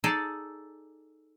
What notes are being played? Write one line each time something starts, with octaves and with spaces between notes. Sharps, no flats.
D#4 G#4 A4 D5 A5